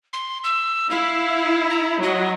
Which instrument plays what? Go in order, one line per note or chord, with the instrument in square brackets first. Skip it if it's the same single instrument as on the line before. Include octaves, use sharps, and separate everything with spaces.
[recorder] C6
E6
[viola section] E4 [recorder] F5
[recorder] A#5
[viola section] F#3 [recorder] D#5